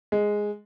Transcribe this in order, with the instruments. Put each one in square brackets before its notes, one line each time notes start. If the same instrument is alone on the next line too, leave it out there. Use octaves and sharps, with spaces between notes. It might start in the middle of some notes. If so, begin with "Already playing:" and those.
[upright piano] G#3